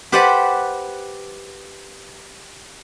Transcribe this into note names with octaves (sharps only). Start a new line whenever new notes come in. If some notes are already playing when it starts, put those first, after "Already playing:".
G4 B4 C5 D5 F#5